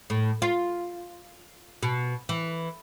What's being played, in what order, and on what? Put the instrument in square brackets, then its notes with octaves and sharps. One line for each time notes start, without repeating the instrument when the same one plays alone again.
[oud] A2
F4
B2
E3